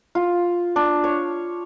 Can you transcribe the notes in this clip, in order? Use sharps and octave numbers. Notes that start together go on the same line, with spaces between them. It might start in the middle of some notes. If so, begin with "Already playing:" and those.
F4
D4
C#5